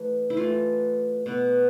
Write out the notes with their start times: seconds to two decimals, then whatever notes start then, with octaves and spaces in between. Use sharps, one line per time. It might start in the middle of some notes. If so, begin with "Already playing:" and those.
Already playing: E3 A3
0.30 E4
0.37 E3 A3 F4
1.26 B2 B3